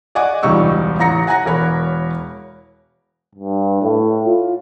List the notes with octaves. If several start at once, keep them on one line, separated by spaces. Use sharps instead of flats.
D5 D#5 F#5 G#5 D6
E1 C#2 G3 D#4 C#6 E6
A1 A#5 A#6 C#7
F#5 G#5 A#5 F#6 A#6
E1 A#4 C#5 B5
G2
A2
F4